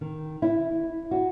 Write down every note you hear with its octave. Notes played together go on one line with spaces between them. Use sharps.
D#3
E4
F#4